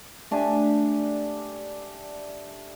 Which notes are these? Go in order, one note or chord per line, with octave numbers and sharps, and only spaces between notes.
A3 D4 G4 G#5